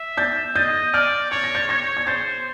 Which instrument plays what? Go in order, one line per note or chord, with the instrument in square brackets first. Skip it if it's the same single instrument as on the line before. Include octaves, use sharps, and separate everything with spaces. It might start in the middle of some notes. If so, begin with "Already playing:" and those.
Already playing: [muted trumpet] E5
[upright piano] G6 A6
[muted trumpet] D#5 [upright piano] G6 A6
[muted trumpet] D5 [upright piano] F6 G6
[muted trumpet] C#5 [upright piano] A6
[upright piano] A#6
G6 A6
[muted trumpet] C#5 [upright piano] G#6 A#6
[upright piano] G#6
[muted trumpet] C5 [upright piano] G6 A6